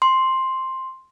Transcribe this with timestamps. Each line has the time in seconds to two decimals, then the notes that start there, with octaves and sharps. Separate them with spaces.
0.02 C6